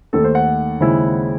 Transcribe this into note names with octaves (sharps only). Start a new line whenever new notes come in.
D#2 D#3 A3 A4
C5
F#5
D#2 C#3 G#3 C4 E4